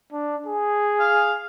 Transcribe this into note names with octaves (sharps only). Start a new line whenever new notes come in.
D4
G#4
F5